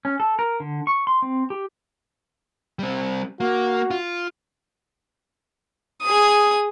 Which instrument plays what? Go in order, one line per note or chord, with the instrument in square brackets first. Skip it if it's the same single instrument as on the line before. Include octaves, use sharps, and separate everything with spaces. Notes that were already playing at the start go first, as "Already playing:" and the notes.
[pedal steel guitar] C#4
A4
A#4
D3
C#6
C6
C4
G4
[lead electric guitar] G3 C4
[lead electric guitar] A#3 [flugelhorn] F#4
[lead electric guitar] F4
[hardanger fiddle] G#4 D#6